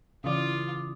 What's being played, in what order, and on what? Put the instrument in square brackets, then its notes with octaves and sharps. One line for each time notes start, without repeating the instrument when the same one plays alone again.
[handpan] C#3 E3 [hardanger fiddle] F4 [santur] D5 D#6